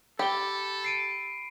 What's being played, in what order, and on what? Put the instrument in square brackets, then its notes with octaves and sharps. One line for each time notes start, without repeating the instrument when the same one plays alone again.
[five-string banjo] G4 [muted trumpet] A4 [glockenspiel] B5 G7
[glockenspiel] C7 D7 D#7